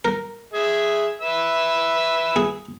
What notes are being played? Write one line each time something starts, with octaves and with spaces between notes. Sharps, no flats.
A#4
G#4 E5
B4 E5 E6
G#4